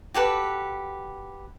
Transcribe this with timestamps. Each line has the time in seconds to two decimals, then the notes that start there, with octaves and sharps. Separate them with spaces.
0.14 F#4 G4 A4 B4